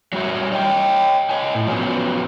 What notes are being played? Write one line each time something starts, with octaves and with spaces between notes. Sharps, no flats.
F#3 G3 F#4 C#5 E5
C#5 D#5 G5
C#5 D#5 G#5
A2
F3 F#3 G#3 B3 C#4